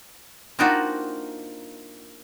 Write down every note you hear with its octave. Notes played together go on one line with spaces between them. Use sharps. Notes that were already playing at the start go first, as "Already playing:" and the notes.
A#3 C4 D4 D#4 F4 F#4